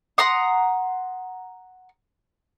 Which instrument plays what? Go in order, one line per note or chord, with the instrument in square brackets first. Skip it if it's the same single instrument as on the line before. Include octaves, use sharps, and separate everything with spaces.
[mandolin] F#5 A#5 C6 D#6